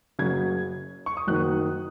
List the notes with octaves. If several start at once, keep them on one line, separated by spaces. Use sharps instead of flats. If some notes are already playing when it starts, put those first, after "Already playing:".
F#1 F#2 C#3 G#6
C#6
D#6
F#1 F#2 D#3 F#6